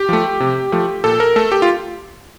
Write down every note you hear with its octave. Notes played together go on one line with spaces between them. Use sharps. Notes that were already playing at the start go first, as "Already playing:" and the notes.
Already playing: G4
F3 A3
C3
F3 A3
A#2 A4
A#4
A3 A4
G4
F4